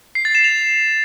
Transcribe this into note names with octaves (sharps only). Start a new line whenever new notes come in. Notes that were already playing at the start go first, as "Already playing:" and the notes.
C7
A6
E7
F7